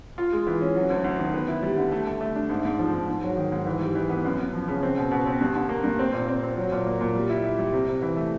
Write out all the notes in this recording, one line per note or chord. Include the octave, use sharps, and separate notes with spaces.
F4
G#3
E3
C#4
F#3
D2
D2
D#3
B3
E4
G3
D3
A3
A3
A3
D4
G#2
G#2
F3
G#2
G#2
F#3
D#3
G#2
E3
G3
E3
B3
F#2
F#2
F3
C#3
C4
B2
B2
C4
G2
D3
A#3
G2
C4
A#2
C4
C4
F#3
A#2
A#3
A#2
G3
E4
E4
G3
C3
C3
E3
A3